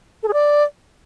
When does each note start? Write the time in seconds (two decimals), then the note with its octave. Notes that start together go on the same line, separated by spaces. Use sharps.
0.23 A4
0.28 G#4
0.33 D5